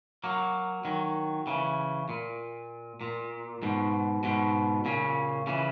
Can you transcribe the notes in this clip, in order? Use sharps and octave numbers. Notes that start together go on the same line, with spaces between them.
F#3 A#3
D#3 F#3
C#3 E3
A#2
A#2
G#2 B2
G#2 B2
A#2 C#3
C#3 E3